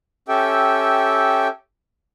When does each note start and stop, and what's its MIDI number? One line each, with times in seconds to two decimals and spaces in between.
0.28 1.48 61
0.28 1.48 67
0.28 1.48 69
0.28 1.48 76
0.28 1.48 79